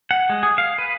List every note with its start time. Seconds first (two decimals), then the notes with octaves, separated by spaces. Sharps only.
0.11 F#5
0.30 G#3
0.43 G#4
0.58 F5
0.78 B4